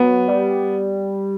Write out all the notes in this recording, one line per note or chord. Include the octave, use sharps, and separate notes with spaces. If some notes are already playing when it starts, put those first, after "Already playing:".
Already playing: F#3 B3
G3